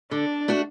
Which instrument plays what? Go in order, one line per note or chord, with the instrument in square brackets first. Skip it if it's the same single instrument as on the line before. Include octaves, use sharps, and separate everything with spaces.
[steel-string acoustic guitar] D3 [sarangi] D4
[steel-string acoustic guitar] A3 D4 F#4